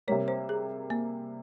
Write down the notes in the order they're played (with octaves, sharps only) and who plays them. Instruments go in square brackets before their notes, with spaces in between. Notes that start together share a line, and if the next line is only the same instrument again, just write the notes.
[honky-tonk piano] C3 G3 A#3 [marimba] C#5
[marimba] C5
G#4
A#3